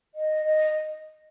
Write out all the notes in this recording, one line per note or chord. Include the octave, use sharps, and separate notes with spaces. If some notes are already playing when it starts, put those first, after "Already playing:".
D#5
D#5